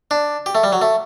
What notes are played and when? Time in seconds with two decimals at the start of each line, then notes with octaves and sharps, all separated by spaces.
0.11 D4
0.46 G4
0.55 A3
0.64 G3
0.72 F#3
0.81 A3